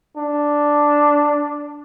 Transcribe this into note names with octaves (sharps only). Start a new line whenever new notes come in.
D4